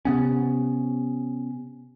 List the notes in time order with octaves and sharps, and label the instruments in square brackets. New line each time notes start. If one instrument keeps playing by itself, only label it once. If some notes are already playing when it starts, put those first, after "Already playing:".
[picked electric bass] C3 B3 C#4